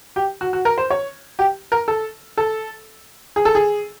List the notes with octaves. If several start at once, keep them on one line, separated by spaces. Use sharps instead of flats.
G4
F#4
F#4
A#4
C5
C#5
G4
A#4
A4
A4
G#4
A4
G#4